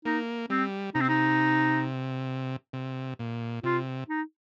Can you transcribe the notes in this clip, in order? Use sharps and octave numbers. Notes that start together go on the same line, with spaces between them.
A#3 D#4
G3 C4
C3 D#4
C4
D#4
C3
A#2
C3 F4
D#4